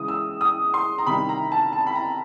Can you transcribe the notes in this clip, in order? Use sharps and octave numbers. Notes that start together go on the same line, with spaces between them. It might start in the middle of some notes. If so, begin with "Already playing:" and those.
Already playing: C#3 E3 G#3 D#6
E6
D#6
C6
A#5
C3 D#3 G3 B5
A#5
A5
A5
B5
A#5